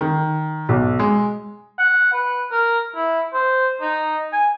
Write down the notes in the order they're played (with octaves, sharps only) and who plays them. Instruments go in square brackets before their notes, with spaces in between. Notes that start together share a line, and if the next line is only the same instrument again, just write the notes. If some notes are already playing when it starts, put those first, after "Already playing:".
[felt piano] D#3
B1
G#3
[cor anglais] F#5
B4
A#4
E4
C5
D#4
G#5